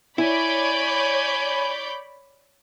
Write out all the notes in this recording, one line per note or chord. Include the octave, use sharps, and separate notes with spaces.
E4 C#5 D5 G#5 B5 G6